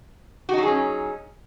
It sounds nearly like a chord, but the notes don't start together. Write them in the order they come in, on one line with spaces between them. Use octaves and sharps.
F#4 D#4 F#3 G#4 C#4